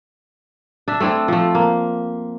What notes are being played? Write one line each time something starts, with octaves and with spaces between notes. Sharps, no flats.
D4 E5
A3 C4 D4 E4
F3 A3
A#3